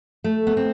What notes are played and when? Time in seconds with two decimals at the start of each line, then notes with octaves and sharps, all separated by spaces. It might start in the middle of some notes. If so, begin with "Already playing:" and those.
0.24 A3
0.47 B3
0.57 C4